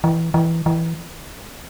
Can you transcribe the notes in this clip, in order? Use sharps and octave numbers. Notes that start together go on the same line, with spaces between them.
E3
E3
E3